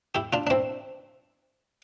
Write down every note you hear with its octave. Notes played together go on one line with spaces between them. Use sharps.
E4 G4
D4 F4
D4
C4 E4